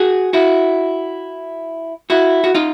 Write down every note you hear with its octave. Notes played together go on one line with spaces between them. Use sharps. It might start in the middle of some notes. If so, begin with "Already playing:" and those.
Already playing: F#4 G#4
E4 F#4
E4 F#4
F#4
D#4 F4